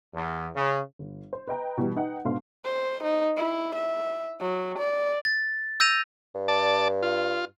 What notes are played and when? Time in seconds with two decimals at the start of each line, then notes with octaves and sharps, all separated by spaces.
0.14 E2
0.56 C#3
0.99 G1
1.33 C5
1.48 B4 D#5 G5 A#5
1.77 B2 E3 G3
1.96 D#4 B4 F#5 G5
2.25 G#2 B2 D4 A4 F5 C6
2.65 C5
3.03 D#4
3.37 E4
3.75 E5
4.40 F#3
4.78 D5
5.25 A6
5.80 E6 G6 A#6 D#7 F7
6.35 G2
6.48 D5 A5
7.02 F4